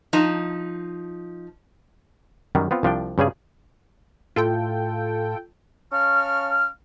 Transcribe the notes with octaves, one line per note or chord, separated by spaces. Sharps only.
F3 D#4
F#2 D#3 F#3 G3
B3 C4 F4
C2 F3 D4 G5
G2 C#3 G3 G#4
A2 F4 A4 G5
C#4 F5 A5 C#6 F6